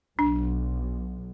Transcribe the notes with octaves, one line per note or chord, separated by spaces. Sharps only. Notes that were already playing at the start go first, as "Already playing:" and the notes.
B1 D4